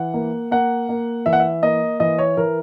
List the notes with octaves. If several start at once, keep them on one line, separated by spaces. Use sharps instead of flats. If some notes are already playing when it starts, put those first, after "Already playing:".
Already playing: E3 F#5
A#3
A#3 F#5
A#3
E3 E5
F#5
E5
A#3 D#5
E3 D#5
C#5
E3 A#4